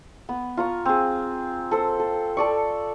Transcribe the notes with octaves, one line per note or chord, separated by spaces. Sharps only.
B3
F4 A#5 C#6
C4 G#4
A4 C5
A4
A4 D5 C#6